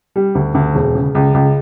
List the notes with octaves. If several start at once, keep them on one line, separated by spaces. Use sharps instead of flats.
G3
D2
D2
E1
C#3
C#2
C#2